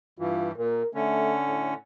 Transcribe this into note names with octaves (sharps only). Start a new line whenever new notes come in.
G2 E3 F4
A#2 A#4
D3 A3 C#4
A2